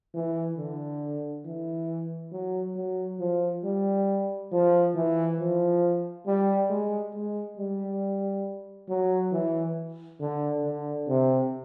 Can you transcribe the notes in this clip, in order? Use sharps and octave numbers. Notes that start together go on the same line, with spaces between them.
E3
D3
E3
F#3
F#3
F3
G3
F3
E3
F3
G3
G#3
G#3
G3
F#3
E3
D3
D3
C3